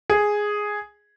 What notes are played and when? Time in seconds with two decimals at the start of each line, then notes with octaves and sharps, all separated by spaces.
0.10 G#4